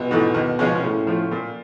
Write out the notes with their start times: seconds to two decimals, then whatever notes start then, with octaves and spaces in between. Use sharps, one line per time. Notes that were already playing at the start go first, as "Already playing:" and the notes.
Already playing: A#1 B2
0.11 G#2 E3 A3
0.34 D#2
0.59 C#3 F3 G#3 C#4
0.83 A2 C#3
1.07 F3 A3
1.31 A#2